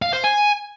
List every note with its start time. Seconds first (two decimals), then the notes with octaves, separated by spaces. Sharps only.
0.02 F5
0.13 C5
0.24 G#5